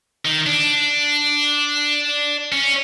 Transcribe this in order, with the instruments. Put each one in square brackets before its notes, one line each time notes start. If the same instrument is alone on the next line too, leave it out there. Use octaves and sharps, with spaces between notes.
[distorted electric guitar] D#3
D4
C#4